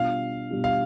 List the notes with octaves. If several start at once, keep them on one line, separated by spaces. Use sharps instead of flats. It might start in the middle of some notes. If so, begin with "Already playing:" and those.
Already playing: B2 G3 D4 F4 F5
B2 G3 D4 F4
F5